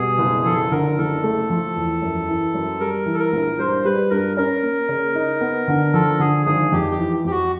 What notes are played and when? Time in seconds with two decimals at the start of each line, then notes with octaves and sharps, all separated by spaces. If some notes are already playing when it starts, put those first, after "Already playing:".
Already playing: B2 G3 G#4
0.19 F#1
0.45 F3 A4
0.71 D3 A#4
0.97 F#1 A4
1.24 A3
1.50 F3
1.76 E2
2.02 F#2
2.28 E3
2.54 F#2
2.80 G3 A#4
3.06 E3
3.14 A4
3.20 A#4
3.33 A#1
3.59 G2 C5
3.85 G3 B4
4.10 G2 A#4
4.37 C#4 A#4
4.63 A#3
4.89 C#3
5.15 D#4
5.41 B3
5.68 D3
5.94 F3 A4
6.20 D3 G#4
6.46 G#1 G#4
6.72 F2 G4
6.92 G4
6.98 E3
7.24 F2 G4
7.31 F#4